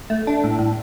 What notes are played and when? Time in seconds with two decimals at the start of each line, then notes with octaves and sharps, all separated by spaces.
0.10 A3
0.27 D4
0.44 A2
0.59 A2